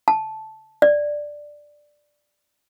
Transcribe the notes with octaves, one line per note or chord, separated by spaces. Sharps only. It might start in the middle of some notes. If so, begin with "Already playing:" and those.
A5
D5